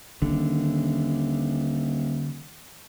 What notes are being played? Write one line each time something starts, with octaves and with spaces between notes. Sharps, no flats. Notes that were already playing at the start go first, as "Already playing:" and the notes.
D#1 D3 D#3